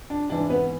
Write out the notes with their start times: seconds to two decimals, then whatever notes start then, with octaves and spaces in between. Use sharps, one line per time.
0.10 D4
0.30 G#2 E3 D4
0.49 B3 B4